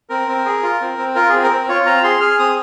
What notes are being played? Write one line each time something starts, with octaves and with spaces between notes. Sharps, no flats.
C4 A#4
C4
G#4
F4
C4
C4
F4 A#4
C4 G#4
A#4
C4
F4 C#5
C4 A#5
G#4 C6
G#4 F6
C4 D#6